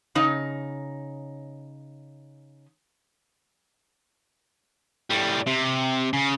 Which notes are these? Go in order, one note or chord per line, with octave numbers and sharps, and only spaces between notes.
C#3 D#4
A2 G3
C3
C#3